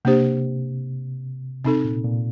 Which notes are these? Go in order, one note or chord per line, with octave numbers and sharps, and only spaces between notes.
C3 A#3 D4 G4 C5
C3 C4 D#4 A4
A#2
A#2